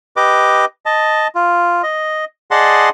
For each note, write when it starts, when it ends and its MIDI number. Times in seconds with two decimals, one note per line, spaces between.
0.17 0.65 67
0.17 0.65 71
0.17 0.65 75
0.17 0.65 86
0.86 1.27 75
0.86 1.27 81
1.35 1.82 65
1.83 2.25 75
2.51 2.89 68
2.51 2.89 74
2.51 2.89 75
2.51 2.89 78
2.51 2.89 81
2.51 2.89 84